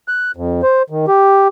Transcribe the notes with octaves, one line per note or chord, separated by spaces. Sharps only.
F#6
F2
C5
D#3
G4